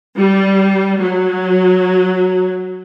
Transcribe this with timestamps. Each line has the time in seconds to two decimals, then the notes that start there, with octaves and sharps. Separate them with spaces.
0.18 G3
1.01 F#3